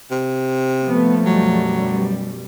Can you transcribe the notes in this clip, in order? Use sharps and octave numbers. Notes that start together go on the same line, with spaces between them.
C3
F3 A3 B3
F#2 B2 F#3 G3